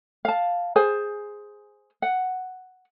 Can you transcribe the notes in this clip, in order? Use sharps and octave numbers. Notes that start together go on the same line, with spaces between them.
F5 A5
G#4 C5 G#5
F#5